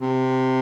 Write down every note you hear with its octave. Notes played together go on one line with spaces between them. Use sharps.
C3